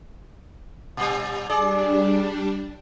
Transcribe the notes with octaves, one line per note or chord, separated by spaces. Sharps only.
A#2 G3
G3 D4 G#4 D5